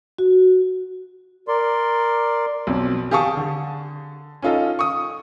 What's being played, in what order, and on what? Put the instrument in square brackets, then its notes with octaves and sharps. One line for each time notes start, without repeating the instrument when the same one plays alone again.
[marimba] F#4
[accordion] A#4 D5 C6
[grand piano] B1 F2
G4 G#4 F5 A5 C#6 D#6
D3
C#4 D#4 F4 A4 D#5
C#6 D#6